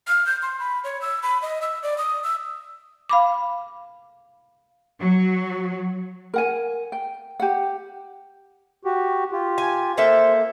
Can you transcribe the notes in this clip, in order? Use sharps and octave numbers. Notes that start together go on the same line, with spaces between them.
F6
G6
C6
B5
C#5
E6
B5
D#5
E6
D5
D#6
E6
F5 B5 D6
F#3
A#4 F#5 G#5
G5
G4 F#5
F#4 G4
F4 G4
G#5
A#3 A4 C5 E5